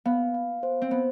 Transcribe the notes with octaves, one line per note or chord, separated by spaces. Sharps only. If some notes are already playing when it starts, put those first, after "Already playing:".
B3 F5
F5
C5
C4
B3 C5